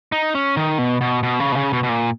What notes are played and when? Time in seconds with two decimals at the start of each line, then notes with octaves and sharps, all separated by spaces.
0.12 D#4
0.35 C#4
0.56 D#3
0.79 B2
1.01 B2
1.23 B2
1.40 C#3
1.52 B2
1.56 C#3
1.73 B2
1.83 B2
1.89 A#2